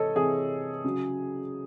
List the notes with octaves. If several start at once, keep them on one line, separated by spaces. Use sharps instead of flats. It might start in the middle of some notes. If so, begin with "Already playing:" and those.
Already playing: C3 E3 A4 C#5 D#5
C3 E3 G#4
C#3 F#3